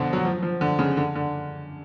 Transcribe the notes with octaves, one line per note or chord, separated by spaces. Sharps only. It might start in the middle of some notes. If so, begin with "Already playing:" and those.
Already playing: B2 D3 F3
F#3
F3
F3
D3
C#3
D3
D3